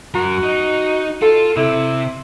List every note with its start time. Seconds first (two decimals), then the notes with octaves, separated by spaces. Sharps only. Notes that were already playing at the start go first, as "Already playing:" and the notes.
0.14 F#2 F#4 A#4
0.43 D#4
1.22 F4 A4
1.56 C3 E4